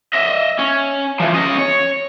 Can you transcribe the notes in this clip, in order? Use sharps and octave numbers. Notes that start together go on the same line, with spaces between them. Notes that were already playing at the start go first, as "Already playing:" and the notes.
D#5 E5
C#4
E3 F3
C#4 D#5
C#5